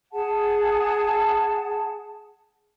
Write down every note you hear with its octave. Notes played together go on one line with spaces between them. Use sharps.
G#4 F#5 A5